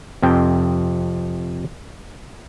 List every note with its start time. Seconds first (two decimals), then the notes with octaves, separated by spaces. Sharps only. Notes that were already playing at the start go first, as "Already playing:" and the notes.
0.22 F2 C3 G5